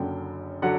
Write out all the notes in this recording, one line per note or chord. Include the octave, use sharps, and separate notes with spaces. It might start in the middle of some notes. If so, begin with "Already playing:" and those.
Already playing: F#1 F#2 D3 F#3 G5
D3 F#3 F#5